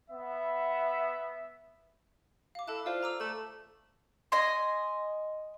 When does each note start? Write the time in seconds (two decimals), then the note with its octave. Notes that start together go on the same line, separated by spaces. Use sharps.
0.11 B3 E5
2.55 F5 D6
2.68 E4 A4 A5 F#6
2.86 F4 C5 D5
3.03 A#5 D6 E6
3.20 A3 A5 F#7
4.32 D#5 G#5 C6